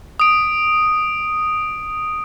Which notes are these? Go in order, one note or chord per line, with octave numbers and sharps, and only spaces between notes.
D#6 D7